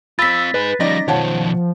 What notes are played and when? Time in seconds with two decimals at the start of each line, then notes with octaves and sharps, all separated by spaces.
0.19 C4 F4 B5 E6 A6 B6
0.54 D#4 G#4 B4
0.80 F3 G3 C#4 D#4 D5 A#6
1.08 B2 D#3 F3 C#5 F#5 A5